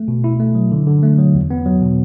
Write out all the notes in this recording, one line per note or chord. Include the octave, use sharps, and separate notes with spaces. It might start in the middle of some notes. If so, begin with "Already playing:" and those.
Already playing: A3
B2
E4
A3
F#3
D3
D3
A3
F#3
E2
B3
F#3
B2